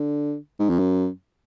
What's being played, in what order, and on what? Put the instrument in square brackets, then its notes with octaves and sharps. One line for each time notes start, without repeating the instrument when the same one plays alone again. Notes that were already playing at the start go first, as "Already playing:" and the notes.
Already playing: [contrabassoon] D3
G#2
F2
F#2